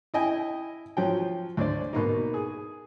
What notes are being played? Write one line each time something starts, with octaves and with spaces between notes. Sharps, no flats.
E4 D#5 G5 G#5
F3 F#3 G5
D2 D4 C5 D5
B2 A#3 D#4
G#4